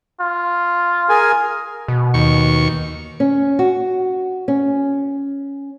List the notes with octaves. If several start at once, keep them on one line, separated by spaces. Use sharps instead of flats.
F4
G#4 A#4 G#5
B2
D#2 C#6
C#4
F#4
C#4